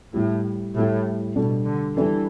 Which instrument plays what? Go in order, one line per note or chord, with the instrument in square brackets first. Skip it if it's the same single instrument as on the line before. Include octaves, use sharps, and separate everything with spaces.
[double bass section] A2 [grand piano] G3 E4 G4
[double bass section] A2 [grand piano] G3 E4 G4
[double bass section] B2 [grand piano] G3 D4 A4
[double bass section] D3
[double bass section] E3 [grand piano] G3 D4 A4